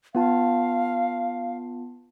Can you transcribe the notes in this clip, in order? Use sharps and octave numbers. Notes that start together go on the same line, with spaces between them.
B3 F4 F5 A5